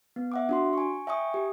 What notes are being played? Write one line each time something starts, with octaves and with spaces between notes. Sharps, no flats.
B3
E5 F#5 D6
D4 F#4 C6
G#5 C#6
E5 G5 G#5 C#6 D#6
G4